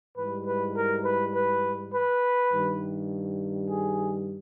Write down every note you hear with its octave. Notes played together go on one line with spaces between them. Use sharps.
G#2 E3 G3 B4
B4
A#4
B4
B4
B4
G2 D#3 G3
G#4